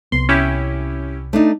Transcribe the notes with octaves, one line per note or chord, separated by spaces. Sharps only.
C2 B3 C6
C#4 E4 G4
A3 D4 D#4